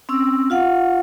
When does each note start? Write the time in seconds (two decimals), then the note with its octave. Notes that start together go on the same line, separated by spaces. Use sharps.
0.09 C4 C#4 E6
0.50 F4 F5 F#5